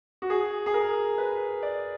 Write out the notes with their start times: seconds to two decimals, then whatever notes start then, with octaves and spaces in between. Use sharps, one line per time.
0.22 F#4
0.30 G#4
0.66 G#4
0.74 A#4
1.18 B4
1.63 D5